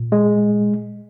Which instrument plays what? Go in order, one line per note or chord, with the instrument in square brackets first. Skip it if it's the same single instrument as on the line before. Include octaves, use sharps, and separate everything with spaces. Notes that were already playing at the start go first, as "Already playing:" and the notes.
Already playing: [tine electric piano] A#2
G#3